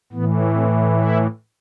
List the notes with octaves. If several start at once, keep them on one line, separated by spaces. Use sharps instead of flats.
A2 E3 B3
C4
E4